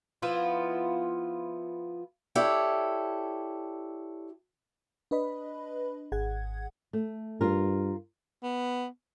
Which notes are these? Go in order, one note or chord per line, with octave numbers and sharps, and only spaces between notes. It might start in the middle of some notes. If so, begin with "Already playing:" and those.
F3 B3 E4 F4
E4 G4 A4 C#5 D5
D4 B4 D#5 B5
G#1 G#4 F#5 G#6
A3
G2 F4 A#4
B3